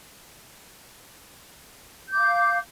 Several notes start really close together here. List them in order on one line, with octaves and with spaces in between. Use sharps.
G6 D6 F5